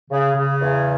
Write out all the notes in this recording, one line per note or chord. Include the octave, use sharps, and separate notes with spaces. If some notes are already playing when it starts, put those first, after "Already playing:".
C#3
C#3
E2